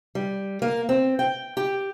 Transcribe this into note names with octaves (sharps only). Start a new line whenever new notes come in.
G3
A#3
C4
G5
G4